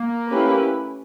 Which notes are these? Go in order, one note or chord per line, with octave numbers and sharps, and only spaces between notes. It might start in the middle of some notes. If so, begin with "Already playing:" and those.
Already playing: A#3
A3 C#4 E4 G4 B4